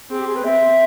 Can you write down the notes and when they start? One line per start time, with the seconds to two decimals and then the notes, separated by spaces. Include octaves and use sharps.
0.10 C4 G#4
0.19 G4
0.27 G#4
0.36 B4
0.44 C4 E5